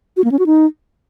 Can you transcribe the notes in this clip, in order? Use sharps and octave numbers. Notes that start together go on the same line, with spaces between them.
F#4
A#3
C#4
F#4
D#4